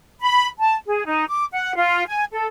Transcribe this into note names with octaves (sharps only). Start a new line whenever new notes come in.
B5
A5
G#4
D#4
D6
F#5
F4
G#5
A4